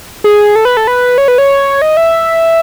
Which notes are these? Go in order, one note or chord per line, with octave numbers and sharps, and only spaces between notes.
G#4
A4
B4
A4
B4
C#5
B4
C#5
D#5
E5